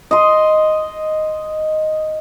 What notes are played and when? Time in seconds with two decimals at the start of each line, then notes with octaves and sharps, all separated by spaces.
0.11 D#5 C6